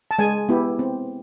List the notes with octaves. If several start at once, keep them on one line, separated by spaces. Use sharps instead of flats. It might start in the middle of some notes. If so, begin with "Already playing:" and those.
A5
G#3 G#5
B3 E4 G4
C4